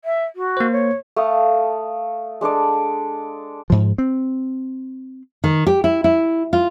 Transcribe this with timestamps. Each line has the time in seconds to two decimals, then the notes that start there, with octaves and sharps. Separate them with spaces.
0.05 E5
0.36 F#4
0.57 A#3 C5
0.72 C#5
1.16 A3 A4 F5 D#6
2.41 G#3 D4 A4 D5
3.70 G#2 F3
3.98 C4
5.44 D#3
5.67 G4
5.84 E4
6.04 E4
6.53 F4